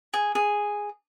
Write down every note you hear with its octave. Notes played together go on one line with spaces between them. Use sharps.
G#4
G#4